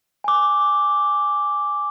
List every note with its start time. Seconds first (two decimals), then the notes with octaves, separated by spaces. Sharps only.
0.24 G#5 D6